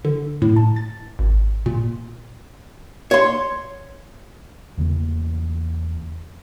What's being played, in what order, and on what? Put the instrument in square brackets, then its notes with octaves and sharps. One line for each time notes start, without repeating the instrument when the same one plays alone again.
[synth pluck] D3
A2
A5
A6
G#1
A#2
[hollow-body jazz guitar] C#5 C6
[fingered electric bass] E2 C#3 E3 A#3